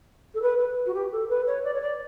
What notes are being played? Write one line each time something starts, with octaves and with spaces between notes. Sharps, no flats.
A4
B4
B4
F#4
G4
A4
B4
C#5
D5
C#5
D5